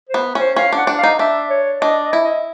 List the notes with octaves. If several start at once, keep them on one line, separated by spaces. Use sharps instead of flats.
C5
B3
C#4 C5
C#4 F5
D4
F#5
D4
F5
D#4
D4 E5
C#5
D4 D#5
D#5
E4
D#5